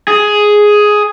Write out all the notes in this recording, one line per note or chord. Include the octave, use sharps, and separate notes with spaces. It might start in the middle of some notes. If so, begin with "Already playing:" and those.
G#4